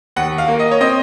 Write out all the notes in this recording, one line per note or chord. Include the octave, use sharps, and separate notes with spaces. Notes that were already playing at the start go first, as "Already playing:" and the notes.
D#2 F#5
F5
A#3
D#5
C#5
C4 D#5